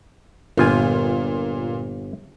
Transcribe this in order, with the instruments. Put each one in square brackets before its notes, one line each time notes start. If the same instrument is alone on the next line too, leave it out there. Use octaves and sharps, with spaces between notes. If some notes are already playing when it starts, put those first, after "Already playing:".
[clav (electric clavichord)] G1 F4 G#5 [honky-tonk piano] A#2